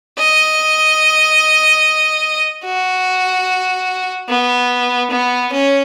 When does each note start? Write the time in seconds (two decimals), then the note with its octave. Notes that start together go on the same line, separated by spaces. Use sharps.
0.18 D#5
2.64 F#4
4.29 B3
5.11 B3
5.52 C#4